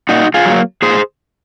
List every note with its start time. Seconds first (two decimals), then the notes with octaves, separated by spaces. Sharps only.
0.09 A#2 D#4 F#4
0.34 F4 G#4
0.45 F#3
0.50 A#3
0.82 A#2 G#4 C5